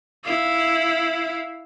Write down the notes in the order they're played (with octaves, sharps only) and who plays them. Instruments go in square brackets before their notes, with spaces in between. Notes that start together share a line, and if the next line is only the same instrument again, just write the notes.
[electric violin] E4 F5